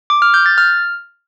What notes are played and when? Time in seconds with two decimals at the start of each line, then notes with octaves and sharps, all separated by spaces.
0.10 D6
0.22 F6
0.34 G6
0.46 A6
0.58 F6